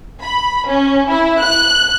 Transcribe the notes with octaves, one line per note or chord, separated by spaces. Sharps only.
B5
C#4
E4
F#6